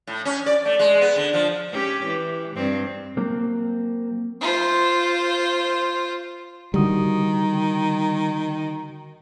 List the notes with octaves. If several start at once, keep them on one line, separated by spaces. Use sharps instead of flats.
A2
C#4
D5
A3
G#3
B3
D3
F3
C#4 G4
E3
G2 C4
F#3 A#3 C4
F4 C5
D3 D#3 G3 F#4 D#6